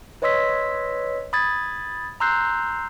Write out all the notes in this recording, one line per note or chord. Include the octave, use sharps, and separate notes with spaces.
B4 C#5 D#5 C6 E6 B6
B5 D#6 G#6 A6
A#5 C6 E6 F#6 G6 C7